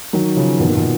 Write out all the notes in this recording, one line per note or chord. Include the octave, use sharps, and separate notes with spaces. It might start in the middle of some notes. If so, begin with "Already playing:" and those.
D#3 F#3
C#3 F3
B2 D#3
A#2
B2